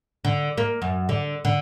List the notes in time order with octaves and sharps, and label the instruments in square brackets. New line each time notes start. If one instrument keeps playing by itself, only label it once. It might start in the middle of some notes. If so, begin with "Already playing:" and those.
[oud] D3
A#3
F#2
D3
D3